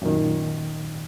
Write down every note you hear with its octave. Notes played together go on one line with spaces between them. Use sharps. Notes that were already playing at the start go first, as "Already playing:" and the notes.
F#2 A#2 D#3